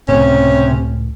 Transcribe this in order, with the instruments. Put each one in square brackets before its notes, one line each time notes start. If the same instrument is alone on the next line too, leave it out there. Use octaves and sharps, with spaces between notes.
[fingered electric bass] C#2 A2 [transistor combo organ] C3 [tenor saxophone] C#4